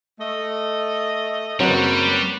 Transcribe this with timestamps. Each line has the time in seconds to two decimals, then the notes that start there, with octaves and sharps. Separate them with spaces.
0.20 A3 D#5
1.60 F#1 F#3 G3 C4 B4 C#5